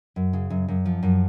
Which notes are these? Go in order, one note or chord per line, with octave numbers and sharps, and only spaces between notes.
F#2
C#3
F#2
F#2
F3
F#2